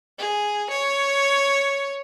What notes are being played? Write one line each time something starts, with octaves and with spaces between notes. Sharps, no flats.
G#4
C#5